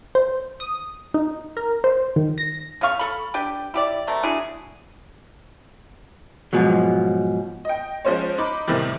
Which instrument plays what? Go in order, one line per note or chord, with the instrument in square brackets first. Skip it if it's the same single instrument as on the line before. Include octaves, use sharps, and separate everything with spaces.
[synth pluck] C5
D#6
D#4
A#4
C5
D#3
A#6
[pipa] C#3 B3 F5 C#6
A4 B5
D4 G4 B4 G5
E4 G4 D5
C3 A3 A#4
D4 E4 F#4 G#4
[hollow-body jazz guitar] G#2 B2 F3 F#3
[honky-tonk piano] D#5 G5
F3 G#3 C#4 C5 C#5
D#4 B5 D6
A2 C3 D#3 E3 G3